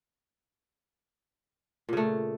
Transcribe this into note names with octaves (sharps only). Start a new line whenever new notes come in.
A#2 C#3 A3